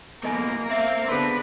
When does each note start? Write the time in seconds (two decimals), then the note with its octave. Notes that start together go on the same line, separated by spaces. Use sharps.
0.24 C#2 B2 A#3 A4 A#4 D#5 G#5
0.71 C4 E5 F5
1.08 D3 B3 D4 G#4 B4 C6